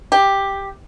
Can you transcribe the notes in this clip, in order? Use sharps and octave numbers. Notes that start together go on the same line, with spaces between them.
G4